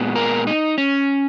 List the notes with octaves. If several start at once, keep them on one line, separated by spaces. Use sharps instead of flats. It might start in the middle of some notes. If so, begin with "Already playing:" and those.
Already playing: A#2 G#3 B3
A#4
D#4
C#4